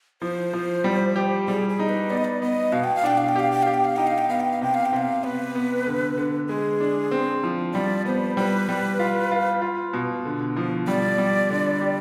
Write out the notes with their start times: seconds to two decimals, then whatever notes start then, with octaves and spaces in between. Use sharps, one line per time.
0.22 F3 C5
0.53 F3
0.84 G3
1.16 G4
1.48 G3 G#4
1.69 G#4
1.79 D#4
1.89 B4
2.10 B3 D5
2.17 D#5
2.24 D5
2.42 B3 D#5
2.72 B2 F5
2.84 G5
2.96 F5
3.04 D4 G5
3.17 F5
3.29 G5
3.36 G4 F5
3.52 G5
3.62 G4 F5
3.74 G5
3.85 F5
3.96 D#4 G5
4.07 F5
4.18 G5
4.29 B3 F5
4.40 G5
4.51 F5
4.61 C3 G5
4.74 F5
4.86 G5
4.93 C3 F5
5.24 B3 B4
5.55 B3
5.87 D3
6.18 D3
6.49 G#3 G#4
6.80 D4
7.11 C4
7.43 F3
7.74 G3 D5
8.05 B3 C5
8.37 G3 B4
8.69 G3
8.99 F4
9.31 F4
9.62 F4
9.93 B2
10.25 D3
10.56 F3
10.87 G3 D5
11.18 G3
11.50 D3
11.81 G4